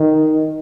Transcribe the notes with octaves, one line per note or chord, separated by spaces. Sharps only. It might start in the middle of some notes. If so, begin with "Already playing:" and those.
Already playing: D#3